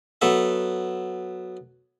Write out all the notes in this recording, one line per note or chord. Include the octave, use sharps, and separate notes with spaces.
F#3 B3 A4 E5